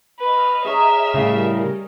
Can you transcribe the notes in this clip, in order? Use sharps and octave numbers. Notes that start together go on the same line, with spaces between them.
B4 D#5 F6
G#4 C#5 E5 A#5
A2 C#3 G3 A#4